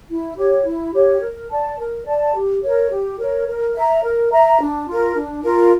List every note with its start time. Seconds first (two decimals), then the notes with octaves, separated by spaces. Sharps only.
0.09 E4
0.37 G4 C#5
0.65 E4
0.93 G4 C#5
1.21 A#4
1.49 D5 A5
1.78 A#4
2.06 D5 A5
2.35 G4
2.63 A#4 C#5
2.90 G4
3.19 A#4 C#5
3.47 A#4
3.74 E5 A#5
4.03 A#4
4.32 E5 A#5
4.60 D4
4.88 F4 A#4
5.15 D4
5.44 F4 A#4